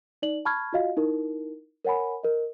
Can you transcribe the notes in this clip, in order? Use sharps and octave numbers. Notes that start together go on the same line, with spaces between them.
D#4 D5 F#7
A5 B5 C#6 F6 G#6
F4 F#4 D#5 F5
D#4 E4 A#4
A#4 C#5 F#5 G#5 B5
A#4 D#5